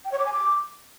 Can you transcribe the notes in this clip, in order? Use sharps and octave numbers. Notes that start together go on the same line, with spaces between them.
G5
C#5
D6
G#5
D6